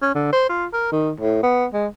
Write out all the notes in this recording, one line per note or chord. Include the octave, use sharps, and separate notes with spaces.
C#4
D3
C5
F4
A#4
D#3
A2
B3
G#3